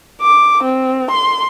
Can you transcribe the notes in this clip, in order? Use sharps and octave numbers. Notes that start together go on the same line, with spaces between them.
D6
C4
C6